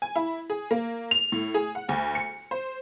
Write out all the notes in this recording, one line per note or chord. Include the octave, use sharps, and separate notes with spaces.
G#5
E4
G#4
A#3
F7
A2
G#4
F#5
D2
C#7
C5